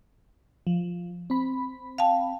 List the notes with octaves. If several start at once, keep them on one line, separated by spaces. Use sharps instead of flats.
F3
C4 B5
F5 G5 A5